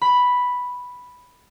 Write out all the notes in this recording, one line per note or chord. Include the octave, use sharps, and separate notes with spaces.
B5